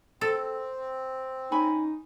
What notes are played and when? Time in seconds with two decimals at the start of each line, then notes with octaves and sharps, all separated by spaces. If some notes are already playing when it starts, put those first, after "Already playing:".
0.21 C4 A4
1.52 C#4 D#4 G#5 B5